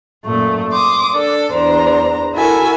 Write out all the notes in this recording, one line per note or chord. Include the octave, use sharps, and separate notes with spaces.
F#2 A#2 A3
C6 D6 D#6
D4 A4
E2 D4 C5 A#5
E4 F#4 A4 A#4 E5 G#5